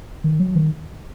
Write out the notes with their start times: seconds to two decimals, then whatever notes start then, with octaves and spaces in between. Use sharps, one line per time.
0.24 D#3
0.40 F#3
0.56 D#3